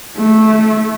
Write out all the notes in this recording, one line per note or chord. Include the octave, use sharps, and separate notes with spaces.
A3